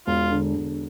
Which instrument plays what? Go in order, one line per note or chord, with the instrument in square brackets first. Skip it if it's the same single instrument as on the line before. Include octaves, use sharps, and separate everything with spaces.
[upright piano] E1 [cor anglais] F4
[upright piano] D3
E1